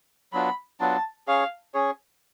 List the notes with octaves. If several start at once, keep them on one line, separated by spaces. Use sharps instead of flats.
F#3 B3 D4 F4 B5
F#3 B3 D4 F4 A5
C#4 G#4 C#5 F5
C#4 G#4 C#5